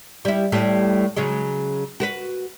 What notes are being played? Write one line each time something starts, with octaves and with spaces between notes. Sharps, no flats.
G3 E4
A2 G3
C#3 F#3 G#3
F#4 A#4 B4